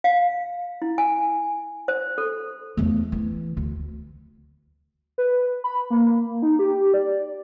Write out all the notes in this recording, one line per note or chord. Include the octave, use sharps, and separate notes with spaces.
F5
E4
G#5
C5
A4
E2 A3
E3
D2
B4
B5
A#3
D#4
G4
D5